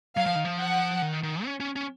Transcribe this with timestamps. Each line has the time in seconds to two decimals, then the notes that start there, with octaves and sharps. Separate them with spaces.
0.17 F#3 F5
0.26 F3
0.35 D#3
0.45 F3
0.59 F#5
1.02 D#3
1.23 D#3
1.45 C#4
1.60 C#4
1.76 C#4